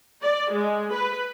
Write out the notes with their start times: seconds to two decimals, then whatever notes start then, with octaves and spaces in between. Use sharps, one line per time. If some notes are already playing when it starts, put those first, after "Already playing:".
0.23 D5
0.52 G#3
0.93 B4